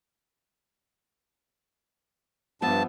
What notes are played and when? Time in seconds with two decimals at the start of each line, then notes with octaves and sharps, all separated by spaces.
2.62 G2 F3 B3 E5 A5